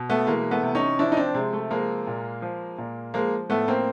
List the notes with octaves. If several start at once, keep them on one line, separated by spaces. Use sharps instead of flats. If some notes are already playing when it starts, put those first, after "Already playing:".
Already playing: B2
A3 B3
E3 G#3 A#3
A3 B3
C3
C#4 D#4
F3 D4 E4
D#4
C4 D4
C3 G#3
A3
F3 G#3 A#3
A#2
F3
A#2
F3 G#3 A#3
A2 A3 B3
A#3 C4